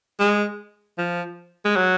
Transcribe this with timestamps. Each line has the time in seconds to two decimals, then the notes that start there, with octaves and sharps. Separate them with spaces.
0.20 G#3
0.98 F3
1.65 G#3
1.76 F#3